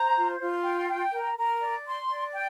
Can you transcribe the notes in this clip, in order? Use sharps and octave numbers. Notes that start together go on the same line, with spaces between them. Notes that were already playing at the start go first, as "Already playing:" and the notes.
Already playing: C5 A#5
F4
F4
G5
G5
A#4
A#4
D5
C6
D5
G5